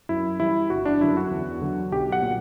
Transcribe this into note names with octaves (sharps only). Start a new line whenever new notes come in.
F#2 E4
E3 G3 E4
G1 F#4
D4
F#2 D3 E4
F#4
E2
D3 F#3
B1 G4
F#5
A#2 F#3